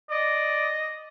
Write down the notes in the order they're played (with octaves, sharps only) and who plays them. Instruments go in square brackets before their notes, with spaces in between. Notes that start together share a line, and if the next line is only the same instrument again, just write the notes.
[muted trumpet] D5 [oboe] D#5